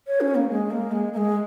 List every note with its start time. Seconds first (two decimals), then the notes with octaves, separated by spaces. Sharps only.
0.07 C#5
0.21 C#4
0.35 A#3
0.50 G#3
0.71 A#3
0.92 G#3
1.13 A#3
1.17 G#3